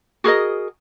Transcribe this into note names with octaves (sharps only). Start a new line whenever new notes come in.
F#4 G#4 A#4 D#5